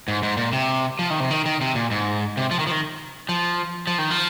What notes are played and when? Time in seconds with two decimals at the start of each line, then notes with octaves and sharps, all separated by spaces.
0.08 G#2
0.23 G#2
0.37 A#2
0.53 C3
0.99 F3
1.10 D#3
1.20 C3
1.31 D#3
1.46 D#3
1.61 C3
1.75 A#2
1.91 G#2
2.37 C3
2.51 F3
2.59 D#3
2.67 F3
2.71 D#3
3.29 F3
3.87 F3
3.99 D#3
4.11 F3